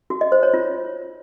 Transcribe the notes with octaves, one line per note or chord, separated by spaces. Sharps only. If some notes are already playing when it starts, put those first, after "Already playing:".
F#4
D#5
C5
C#5
F4